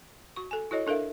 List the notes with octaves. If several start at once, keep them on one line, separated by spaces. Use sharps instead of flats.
F#4 C#6
A4 G#5
E4 F#4 A4 C#5 D#5
D4 A4 A#4 E5 F5